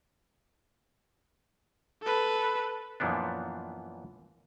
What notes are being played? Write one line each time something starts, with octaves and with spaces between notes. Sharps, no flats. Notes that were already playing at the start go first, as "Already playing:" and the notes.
A4 B4
F#2 A#2 E3 F3 B3 D4